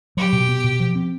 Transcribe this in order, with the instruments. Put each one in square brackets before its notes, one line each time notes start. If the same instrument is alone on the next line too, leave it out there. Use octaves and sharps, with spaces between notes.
[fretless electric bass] F#3 [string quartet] G4
[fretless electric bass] B2
B3
B2
F3
C4